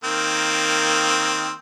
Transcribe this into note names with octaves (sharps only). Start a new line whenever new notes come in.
D#3 A#3 C4